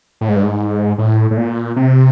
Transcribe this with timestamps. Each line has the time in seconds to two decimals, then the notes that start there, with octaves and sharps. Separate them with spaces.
0.21 A2
0.28 G#2
0.36 G2
0.43 G#2
0.98 A2
1.31 A2
1.37 A#2
1.76 C3